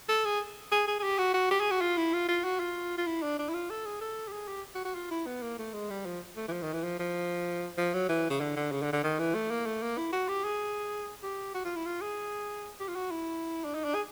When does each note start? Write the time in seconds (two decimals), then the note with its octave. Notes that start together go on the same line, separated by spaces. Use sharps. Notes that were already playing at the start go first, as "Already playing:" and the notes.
0.09 A4
0.25 G#4
0.72 G#4
0.88 G#4
0.99 G#4
1.03 G4
1.18 F#4
1.34 F#4
1.51 G4
1.61 G#4
1.71 F#4
1.81 F4
1.97 E4
2.13 F4
2.29 F4
2.44 F#4
2.60 F4
2.98 F4
3.07 E4
3.22 D4
3.39 D4
3.49 E4
3.54 F4
3.70 A4
3.85 G#4
4.01 A4
4.28 G4
4.33 G#4
4.48 G4
4.75 F#4
4.85 F#4
4.95 F4
5.11 E4
5.26 B3
5.42 A#3
5.59 A3
5.73 G#3
5.90 G3
6.06 F3
6.36 A3
6.48 E3
6.52 F3
6.63 D#3
6.73 E3
6.84 F3
6.99 F3
7.77 F3
7.94 F#3
8.09 E3
8.30 C#3
8.41 D3
8.56 D3
8.72 C#3
8.82 D3
8.93 D3
9.03 D#3
9.19 E3
9.34 A3
9.50 A#3
9.66 A3
9.82 A#3
9.98 E4
10.13 F#4
10.28 G4
10.45 G#4
11.23 G4
11.54 F#4
11.65 F4
11.76 E4
11.86 F4
12.01 G#4
12.80 G4
12.88 F4
12.96 F#4
13.11 E4
13.64 D4
13.74 D#4
13.84 D4
13.95 G#4